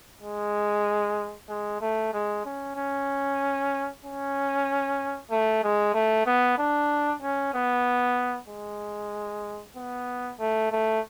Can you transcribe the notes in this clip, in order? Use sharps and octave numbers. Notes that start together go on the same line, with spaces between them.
G#3
G#3
A3
G#3
C#4
C#4
C#4
A3
G#3
A3
B3
D4
C#4
B3
G#3
B3
A3
A3